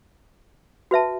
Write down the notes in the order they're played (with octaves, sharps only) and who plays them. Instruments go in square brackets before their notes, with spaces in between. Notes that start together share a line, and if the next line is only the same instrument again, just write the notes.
[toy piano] F#4 B4 E5 A5